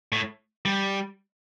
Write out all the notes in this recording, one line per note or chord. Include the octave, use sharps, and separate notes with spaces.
A2
G3